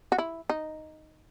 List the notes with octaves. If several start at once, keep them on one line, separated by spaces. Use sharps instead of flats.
F#4
E4
D#4